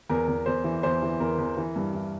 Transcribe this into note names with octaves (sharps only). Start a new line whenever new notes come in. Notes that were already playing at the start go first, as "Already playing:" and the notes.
E2 A#4
E2
E2 C5
E3
E2 C5
E3
E2 A#4
E2
E3
G2
E3